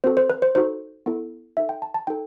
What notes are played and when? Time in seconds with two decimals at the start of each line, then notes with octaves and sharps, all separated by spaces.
0.04 C4 F#4 A4 C5
0.17 C5
0.30 B4
0.42 C5
0.55 D#4 F#4 A4 C5
1.06 B3 E4 A4
1.57 D#4 A4 E5
1.69 G5
1.82 A5
1.94 A5
2.07 D#4 A4 G5